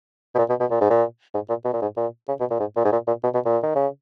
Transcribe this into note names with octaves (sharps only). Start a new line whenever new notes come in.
B2
A#2
B2
B2
A#2
G#2
A#2
G#2
A#2
B2
A#2
G#2
A#2
C#3
B2
A#2
G#2
A#2
G#2
A#2
A#2
B2
B2
A#2
D#3
C#3